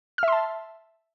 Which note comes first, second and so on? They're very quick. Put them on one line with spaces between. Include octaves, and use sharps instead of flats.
F6 E5 C6 A5